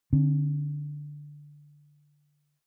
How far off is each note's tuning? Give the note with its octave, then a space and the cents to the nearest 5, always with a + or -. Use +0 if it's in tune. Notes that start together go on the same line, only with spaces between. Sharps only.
D3 +0 C4 +40